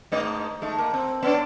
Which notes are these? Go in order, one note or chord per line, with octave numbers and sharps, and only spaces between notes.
G#2 A3 D#5
G#3 A3 D#4
A#3
C4
B3 C#4 D4